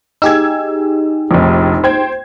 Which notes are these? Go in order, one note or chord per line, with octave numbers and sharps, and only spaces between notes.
D#4 G4 G#4 E6 G#6
F1 A#1
C5 G5 G#6